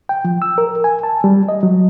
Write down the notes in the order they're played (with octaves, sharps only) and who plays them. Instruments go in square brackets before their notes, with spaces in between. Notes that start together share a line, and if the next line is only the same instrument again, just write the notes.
[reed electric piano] G5
F3
E6
A#4
G#5
A5
G3
D#5
F#3